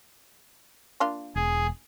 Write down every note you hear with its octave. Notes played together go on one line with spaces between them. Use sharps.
A#3 D4 F4
E1 G#4